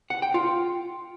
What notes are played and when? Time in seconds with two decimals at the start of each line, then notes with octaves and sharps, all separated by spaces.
0.10 F#5
0.22 G5
0.34 F4